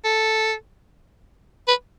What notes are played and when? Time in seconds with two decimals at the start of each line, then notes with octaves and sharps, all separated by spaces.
0.05 A4
1.68 B4